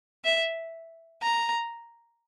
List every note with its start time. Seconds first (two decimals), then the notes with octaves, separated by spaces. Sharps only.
0.24 E5
1.23 A#5